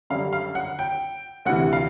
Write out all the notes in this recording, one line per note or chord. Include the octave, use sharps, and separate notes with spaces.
F#2 D3 G3 F5
F5
F#5
G5
D2 C3 E3 F#5
F5